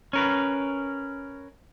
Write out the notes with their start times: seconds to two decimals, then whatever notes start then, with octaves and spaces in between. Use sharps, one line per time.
0.13 C#4 A#4 B4